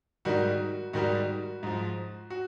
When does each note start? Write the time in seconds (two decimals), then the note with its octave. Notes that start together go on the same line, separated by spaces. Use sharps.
0.25 G#2 D#3 G3 F#4
0.93 G#2 D#3 G3 F#4
1.63 G#2 F3
2.30 F#4